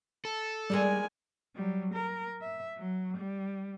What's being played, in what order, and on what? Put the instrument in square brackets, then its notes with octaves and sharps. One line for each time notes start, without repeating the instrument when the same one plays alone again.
[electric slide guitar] A4
[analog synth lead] G3 [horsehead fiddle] G#3 G#5 [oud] A#3 G#4 D5
[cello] F#3 G3
A#4
E5
F#3
G3